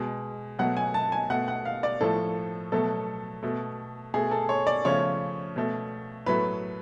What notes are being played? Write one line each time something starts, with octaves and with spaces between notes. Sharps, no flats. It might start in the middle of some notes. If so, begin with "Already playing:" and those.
Already playing: B2 G#3
B2 F#3 A3 F#5
G#5
A5
G#5
B2 A3 F#5
F#5
F5
D5
A2 F3 A3 A4
B2 F#3 A3 A4
B2 A3
B2 A3 G#4
A4
C#5
D5
C#3 F3 A3 C#5
B2 A3
A2 F#3 A3 B4